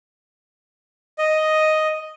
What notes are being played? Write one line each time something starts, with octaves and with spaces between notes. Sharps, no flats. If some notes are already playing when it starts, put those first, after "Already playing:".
D#5